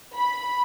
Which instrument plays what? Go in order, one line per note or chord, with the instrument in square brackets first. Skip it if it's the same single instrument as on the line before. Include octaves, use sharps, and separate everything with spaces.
[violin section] B5